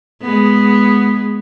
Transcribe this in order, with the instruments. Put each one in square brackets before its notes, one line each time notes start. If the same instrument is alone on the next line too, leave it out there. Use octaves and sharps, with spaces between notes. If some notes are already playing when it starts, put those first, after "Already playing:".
[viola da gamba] G#3 B3